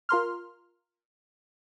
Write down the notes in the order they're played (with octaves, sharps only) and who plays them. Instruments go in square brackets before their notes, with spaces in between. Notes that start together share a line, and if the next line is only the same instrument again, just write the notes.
[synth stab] F4 A#4 C6 F6